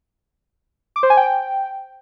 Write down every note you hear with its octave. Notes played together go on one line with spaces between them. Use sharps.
D6
C5
G#5
G5